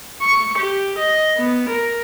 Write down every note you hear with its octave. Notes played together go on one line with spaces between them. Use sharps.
C#6
G4
D#5
B3
A#4